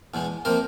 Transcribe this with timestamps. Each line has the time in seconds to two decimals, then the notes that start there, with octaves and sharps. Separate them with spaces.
0.14 E2 B2 G#3
0.45 C3 F3 A#3 A#4 C5